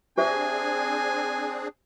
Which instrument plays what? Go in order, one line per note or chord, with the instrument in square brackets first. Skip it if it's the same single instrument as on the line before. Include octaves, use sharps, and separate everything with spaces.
[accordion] C4 D4 G#4 [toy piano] G4 C5 E5 [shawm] G#5